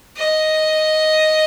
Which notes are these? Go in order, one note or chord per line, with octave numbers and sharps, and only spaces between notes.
D#5